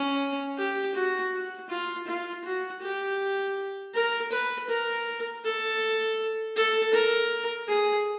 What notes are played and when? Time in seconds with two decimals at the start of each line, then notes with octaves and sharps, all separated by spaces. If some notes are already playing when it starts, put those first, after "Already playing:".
Already playing: C#4
0.58 G4
0.95 F#4
1.33 F#4
1.70 F4
2.07 F4
2.44 F#4
2.82 G4
3.94 A#4
4.32 B4
4.69 A#4
5.44 A4
6.56 A4
6.93 A#4
7.68 G#4